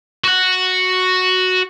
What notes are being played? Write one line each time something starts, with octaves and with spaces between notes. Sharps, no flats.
F#4 F#5